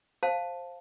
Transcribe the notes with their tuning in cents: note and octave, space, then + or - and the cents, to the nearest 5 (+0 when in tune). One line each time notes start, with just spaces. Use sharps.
C5 +10 F5 +0 A5 +0